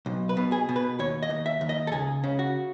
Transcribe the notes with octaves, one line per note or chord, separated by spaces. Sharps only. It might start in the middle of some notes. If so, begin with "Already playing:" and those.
B1
B4
B2
G#4
B2
B4
D#2 C#5
D#5
D#2
E5
D#2
D#5
A4
C#2 G#4
C#3
F#4